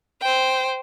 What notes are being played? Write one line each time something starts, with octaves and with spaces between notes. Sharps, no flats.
C5 G5